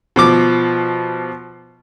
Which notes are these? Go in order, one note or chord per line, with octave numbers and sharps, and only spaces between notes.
B2 F3 D6